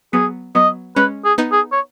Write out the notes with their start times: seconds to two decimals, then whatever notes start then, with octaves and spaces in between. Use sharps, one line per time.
0.13 F#3 B3 G#4
0.55 F#3 B3 D#5
0.96 G#3 C#4 B4
1.25 G#4
1.38 B3 D#4
1.52 G#4
1.72 C#5